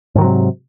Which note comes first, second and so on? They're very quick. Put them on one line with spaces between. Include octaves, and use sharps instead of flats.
G#2 D#3 F#3 C3